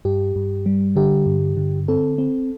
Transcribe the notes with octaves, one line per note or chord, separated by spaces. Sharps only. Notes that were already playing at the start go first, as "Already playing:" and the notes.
G2 G4
G2
G3
D3 G4
G2
D3
C4 A4
C4